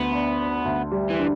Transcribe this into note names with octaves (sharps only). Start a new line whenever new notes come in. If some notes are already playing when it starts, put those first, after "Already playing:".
Already playing: D2 B3
D4
D4
D2
G3
E3
D3